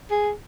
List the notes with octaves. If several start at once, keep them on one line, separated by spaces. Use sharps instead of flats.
G#4